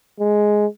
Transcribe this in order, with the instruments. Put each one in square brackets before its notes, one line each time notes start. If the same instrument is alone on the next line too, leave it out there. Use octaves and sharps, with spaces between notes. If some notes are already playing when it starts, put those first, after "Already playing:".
[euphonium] G#3